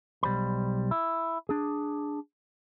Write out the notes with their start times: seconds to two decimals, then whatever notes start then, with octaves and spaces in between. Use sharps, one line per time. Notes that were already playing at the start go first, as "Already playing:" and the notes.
0.23 B1 G3 C5 B5
0.91 E4
1.49 D4 G#4